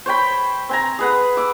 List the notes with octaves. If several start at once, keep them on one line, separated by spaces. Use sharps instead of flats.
C5 C#5 G5 B5
C4 G#5 A#5
G#4 B4 F#5
D6 E6